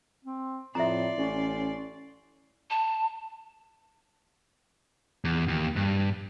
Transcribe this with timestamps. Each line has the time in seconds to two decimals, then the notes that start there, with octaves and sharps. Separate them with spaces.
0.25 C4
0.75 F2 A2 D5 E5 A#5 C6
1.18 A1 C#4
2.70 A5
5.25 E2
5.48 D#2
5.76 G2